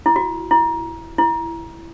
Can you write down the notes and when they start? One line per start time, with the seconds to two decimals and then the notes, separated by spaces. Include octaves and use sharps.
0.06 E4
0.16 F#4
0.51 E4
1.18 E4